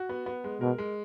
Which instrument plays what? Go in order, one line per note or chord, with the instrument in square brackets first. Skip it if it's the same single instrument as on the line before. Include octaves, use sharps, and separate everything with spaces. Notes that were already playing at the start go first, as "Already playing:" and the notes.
Already playing: [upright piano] F#4
B3
B3
G#3
[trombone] B2 [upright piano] A#4
[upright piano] G#3